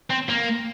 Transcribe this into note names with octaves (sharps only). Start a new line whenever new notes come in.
C4
A#3